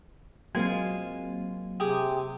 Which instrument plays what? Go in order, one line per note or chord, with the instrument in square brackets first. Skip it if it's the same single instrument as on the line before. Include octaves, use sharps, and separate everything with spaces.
[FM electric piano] F#3 A#3 C4 [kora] G#3 F4 [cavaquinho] G#5
[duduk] C3 [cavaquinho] G4 G#4 D#6